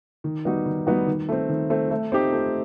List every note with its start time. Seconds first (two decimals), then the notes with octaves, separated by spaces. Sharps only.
0.24 D#3
0.45 G3 B3 D#4 F#4
0.66 D#3
0.87 G3 B3 D#4 F#4
1.07 D#3
1.29 A3 C4
1.49 D#3
1.70 A3 C4
1.91 A3
2.12 C4 D#4 G4
2.33 A3